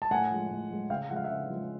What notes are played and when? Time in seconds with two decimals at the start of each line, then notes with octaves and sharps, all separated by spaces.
0.02 A5
0.11 A2 F#5 G#5
0.31 F3 G#3
0.51 A2
0.70 F3 G#3
0.90 C#3 F5 G5
1.10 F3 G#3 F#5
1.16 F5
1.24 C#3 E5 F#5
1.49 F3 G#3